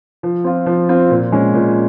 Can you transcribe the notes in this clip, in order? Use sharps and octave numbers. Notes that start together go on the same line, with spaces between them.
F3
C4 F4
F3
C4 F4
A#2
G#3 C#4
A#2